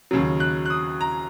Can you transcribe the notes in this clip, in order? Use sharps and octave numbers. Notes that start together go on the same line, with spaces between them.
D#2 C#3 F#3
F#6
F#6
D#6
A#5